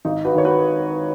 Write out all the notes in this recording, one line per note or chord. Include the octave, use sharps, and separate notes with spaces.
G#1 D#4
F#4 B4
D#3 C#5
F#4 B4